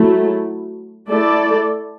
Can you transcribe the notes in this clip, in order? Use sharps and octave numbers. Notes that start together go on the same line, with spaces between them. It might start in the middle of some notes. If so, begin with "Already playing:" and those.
Already playing: F#3 A3 E4
A3 E4 A4 D5